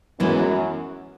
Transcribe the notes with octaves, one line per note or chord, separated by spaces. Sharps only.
F#2 E3 G#3 B3 E4